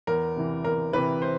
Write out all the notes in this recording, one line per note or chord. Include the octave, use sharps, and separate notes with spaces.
E2 A#4
C3 E3
E2 A#4
C3 E3 B4
C5